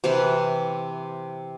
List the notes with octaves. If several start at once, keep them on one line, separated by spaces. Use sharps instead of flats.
C3 E3 B4 C6